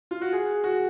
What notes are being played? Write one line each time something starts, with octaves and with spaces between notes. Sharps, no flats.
F4
F#4
G#4
F#4